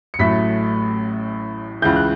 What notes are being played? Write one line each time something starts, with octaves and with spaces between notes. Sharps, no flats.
C#7
A1 A2 F#3 A3 B6
C#2 C#3 E3 G6
F#6